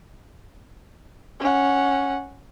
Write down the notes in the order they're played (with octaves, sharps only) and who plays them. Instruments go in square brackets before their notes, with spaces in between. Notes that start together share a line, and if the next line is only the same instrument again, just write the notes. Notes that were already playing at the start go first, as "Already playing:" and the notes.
[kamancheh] C#4 F#5